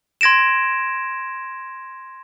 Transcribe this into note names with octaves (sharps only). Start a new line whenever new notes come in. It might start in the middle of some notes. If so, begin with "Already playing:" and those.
C6 G#6 A#6 D7 E7